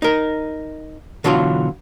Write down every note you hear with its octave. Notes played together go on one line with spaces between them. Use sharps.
D#4 A#4
B2 D3 E3 F#3 F4